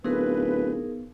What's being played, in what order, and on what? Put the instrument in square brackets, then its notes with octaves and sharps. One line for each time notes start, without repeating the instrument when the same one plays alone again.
[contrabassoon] D1 [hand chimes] B3 [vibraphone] D#4 G#4 A#4 [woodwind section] B4